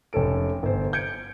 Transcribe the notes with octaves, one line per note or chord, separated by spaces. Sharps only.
F1 C#4 A4 D7
G1 C5
G6 G#6 C#7 D7